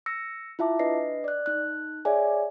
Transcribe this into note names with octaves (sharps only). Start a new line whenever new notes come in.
E6 A#6 C#7
E4 F4 E5 A5 D6
D4 B4 D#5 A#6 C7
D5 F#6
D#4 F#6
G#4 C#5 D5 E5 G#5